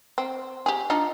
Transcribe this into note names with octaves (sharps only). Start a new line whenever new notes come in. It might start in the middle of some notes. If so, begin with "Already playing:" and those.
C4
G4 G#4
D4 D#4 F4